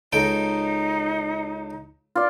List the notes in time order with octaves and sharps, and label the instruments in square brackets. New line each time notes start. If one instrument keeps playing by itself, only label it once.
[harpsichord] C#2 A4 G5 [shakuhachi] D#4
[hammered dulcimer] F4 D5